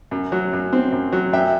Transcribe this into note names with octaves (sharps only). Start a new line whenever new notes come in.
F#2
F#3
F#2
C4
F#2
F#3
F#2 E5 G5